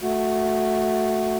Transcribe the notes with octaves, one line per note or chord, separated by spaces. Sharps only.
A3 F#4